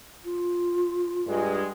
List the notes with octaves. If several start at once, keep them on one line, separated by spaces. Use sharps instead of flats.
F4
G2 G#3